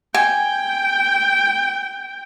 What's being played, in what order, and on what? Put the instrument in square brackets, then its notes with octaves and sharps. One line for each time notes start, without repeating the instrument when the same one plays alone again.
[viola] G5 [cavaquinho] G#5